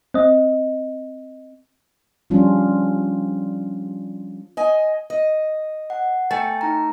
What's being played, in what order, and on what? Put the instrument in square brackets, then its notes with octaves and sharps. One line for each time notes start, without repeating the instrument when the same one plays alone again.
[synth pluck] C4 D#5
[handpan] F3 G3 C#4 D4 F4
[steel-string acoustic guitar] D#5 G#5
D#5
[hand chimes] F#5
[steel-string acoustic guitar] A3 [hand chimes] G5 G#5 A6
[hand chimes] D#4 A#5